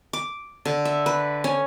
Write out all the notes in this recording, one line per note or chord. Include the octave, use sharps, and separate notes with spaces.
D6
D3
E5
B4
C#4